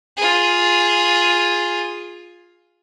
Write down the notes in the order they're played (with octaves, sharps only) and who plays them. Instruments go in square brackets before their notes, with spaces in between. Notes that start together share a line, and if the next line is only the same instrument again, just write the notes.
[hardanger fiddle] F4 G#4